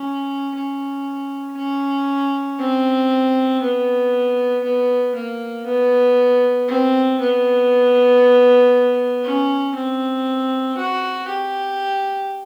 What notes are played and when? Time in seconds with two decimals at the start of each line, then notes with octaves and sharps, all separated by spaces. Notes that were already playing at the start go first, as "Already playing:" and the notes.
Already playing: C#4
0.55 C#4
1.57 C#4
2.59 C4
3.62 B3
4.63 B3
5.15 A#3
5.66 B3
6.68 C4
7.20 B3
9.24 C#4
9.75 C4
10.78 F#4
11.28 G4